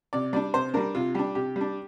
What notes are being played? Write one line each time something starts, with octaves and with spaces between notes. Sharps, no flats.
C3 D5
G3 D4 D5
C3 C5
G3 D4 A#4
C3 F4
G3 D4 G4
C3 G4
G3 D4